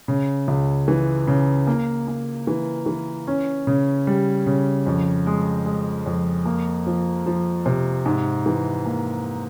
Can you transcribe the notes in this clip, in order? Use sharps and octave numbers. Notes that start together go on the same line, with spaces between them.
C#3
C#2
E3
C#3
A#3
A#3
E3
E3
C#4
C#3
G3
C#3
F2
G#3
G#3
F2
A#3
F3
F3
C3
G#2
E3
A#3